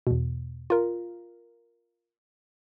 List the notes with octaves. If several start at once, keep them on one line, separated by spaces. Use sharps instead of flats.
E2 B2
F4 A#4